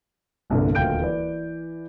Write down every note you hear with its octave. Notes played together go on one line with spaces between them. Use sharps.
G1 C2 G2 A#2 D3
D#1 D2 F5 G5 G6 D7
E3 B4 D5